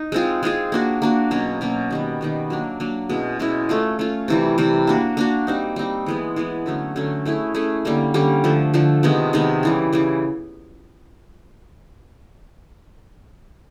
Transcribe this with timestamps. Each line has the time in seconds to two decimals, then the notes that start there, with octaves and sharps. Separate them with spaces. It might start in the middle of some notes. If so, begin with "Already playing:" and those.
Already playing: D#4
0.12 G#3 C4 F4 G#4
0.43 G#3 C4 F4 G#4
0.72 A#3 D4 F#4
1.02 A#3 D4 F#4
1.31 B2 F#3 A#3 C#4
1.61 B2 F#3 A#3 C#4
1.91 D#3 G3 B3
2.21 D#3 G3 B3
2.50 F#3 A#3 D4
2.80 F#3 A#3 D4
3.09 B2 G#3 C#4 E4
3.39 B2 G#3 C#4 E4
3.69 A3 C#4 F4
3.99 A3 C#4 F4
4.28 C3 E3 G3
4.58 C3 E3 G3
4.87 A#3 D4 F#4
5.17 A#3 D4 F#4
5.47 G3 C4 D#4
5.76 G3 C4 D#4
6.06 E3 G#3 B3
6.36 E3 G#3 B3
6.66 D3 F#3 A3 C#4
6.96 D3 F#3 A3 C#4
7.25 A3 C#4 E4 G#4
7.54 A3 C#4 E4 G#4
7.85 D3 G3 A#3 C#4
8.14 D3 G3 A#3 C#4
8.44 D3 F3 A3
8.74 D3 F3 A3
9.03 C3 D#3 G#3 B3
9.33 C3 D#3 G#3 B3
9.63 C#3 E3 G3
9.93 C#3 E3 G3